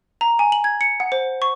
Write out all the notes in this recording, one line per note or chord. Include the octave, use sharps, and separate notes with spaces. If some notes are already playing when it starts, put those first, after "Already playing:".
A#5
G#5
F#7
G#6
C#7
F#5
C5
C#6